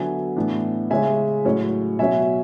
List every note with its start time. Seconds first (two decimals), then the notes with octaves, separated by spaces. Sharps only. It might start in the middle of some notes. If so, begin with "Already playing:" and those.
Already playing: D3 F#3 B3 E5 G#5
0.36 A2 E3 B3 D4
0.90 C#3 G#3 C#4 E5 G#5
1.45 A2 F#3 C#4
1.99 B2 F#3 C#4 E5 G#5